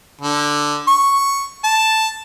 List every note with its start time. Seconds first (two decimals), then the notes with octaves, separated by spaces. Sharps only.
0.21 D3
0.88 C#6
1.64 A5